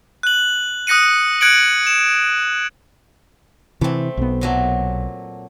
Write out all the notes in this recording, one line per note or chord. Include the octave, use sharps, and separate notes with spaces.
F#6 F#7
D#6 F#6 A#6 C#7 D#7
F#6 G#6 C#7 D7 F#7
E7
C3 E3 A3 C4
B1 B3
A#2 F#3 A3